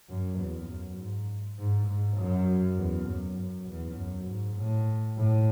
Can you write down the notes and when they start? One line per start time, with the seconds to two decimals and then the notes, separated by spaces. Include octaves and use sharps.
0.09 F#2
0.39 E2
0.69 F#2
0.99 G#2
1.59 G#2
1.88 G#2
2.18 F#2
2.78 E2
3.08 F#2
3.38 F#2
3.68 E2
3.97 F#2
4.28 G#2
4.57 A2
5.17 A2